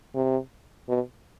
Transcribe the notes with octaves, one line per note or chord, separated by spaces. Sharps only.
C3
B2